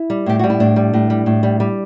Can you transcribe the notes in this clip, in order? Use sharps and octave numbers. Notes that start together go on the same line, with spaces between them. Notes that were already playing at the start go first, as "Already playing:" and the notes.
Already playing: E4
G3
A2 G4
G3 F#4
E4
A2 D4
G3
A2
G3
A2
G3
G3